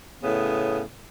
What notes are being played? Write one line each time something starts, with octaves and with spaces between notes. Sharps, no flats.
A2 C#3 B3